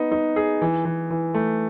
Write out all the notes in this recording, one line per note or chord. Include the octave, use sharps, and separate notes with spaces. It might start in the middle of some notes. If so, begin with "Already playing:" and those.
Already playing: B3 D#4
D#4
G#4
E3
E3
E3
A3